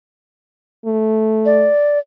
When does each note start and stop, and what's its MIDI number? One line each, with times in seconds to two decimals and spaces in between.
0.86 1.69 57
1.46 1.99 74